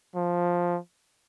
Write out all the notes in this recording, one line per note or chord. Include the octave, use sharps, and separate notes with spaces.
F3